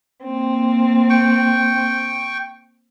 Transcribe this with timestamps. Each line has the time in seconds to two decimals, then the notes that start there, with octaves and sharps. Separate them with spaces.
0.23 A#3 C4
1.10 G5 C#6